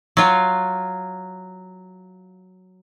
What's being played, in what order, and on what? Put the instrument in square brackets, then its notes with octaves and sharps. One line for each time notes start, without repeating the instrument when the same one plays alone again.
[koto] F#3 F4